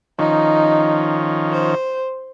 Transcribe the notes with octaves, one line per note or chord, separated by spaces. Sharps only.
D#3 F3 C#4 D#4
C5